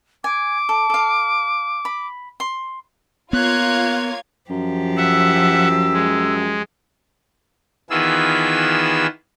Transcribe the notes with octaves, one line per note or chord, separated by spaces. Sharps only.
G#5 D6
A4
A4 F5
B5
C6
A#3 B3 F4 C#5 F5 F#6 G#6
F#2 F3 G4
E5 F#5 E6
G#3
D#3 E3 B3 F4 G#4 E6